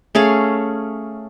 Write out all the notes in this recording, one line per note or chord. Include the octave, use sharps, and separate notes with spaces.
A3 C#4 G#4 F5